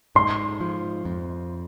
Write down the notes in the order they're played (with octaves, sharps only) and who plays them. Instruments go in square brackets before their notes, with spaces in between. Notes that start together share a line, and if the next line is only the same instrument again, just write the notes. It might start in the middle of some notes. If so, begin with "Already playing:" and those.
[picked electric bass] G#2 [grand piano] C6
[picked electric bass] F3
F2